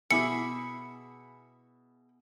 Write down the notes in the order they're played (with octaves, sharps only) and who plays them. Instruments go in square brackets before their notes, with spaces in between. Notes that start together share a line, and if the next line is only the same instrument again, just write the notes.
[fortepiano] B2 E4 D6 [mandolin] G#4 E5 B5 [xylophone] C#7